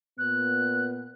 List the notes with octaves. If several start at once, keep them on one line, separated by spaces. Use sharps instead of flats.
A#2 B3 F#6